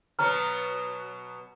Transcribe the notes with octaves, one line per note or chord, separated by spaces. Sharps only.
B2 F#3 B3 A#5 F6